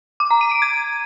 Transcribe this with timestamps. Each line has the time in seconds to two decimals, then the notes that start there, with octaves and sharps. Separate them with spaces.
0.20 D6
0.31 A#5
0.41 D#7
0.51 D7
0.62 G#6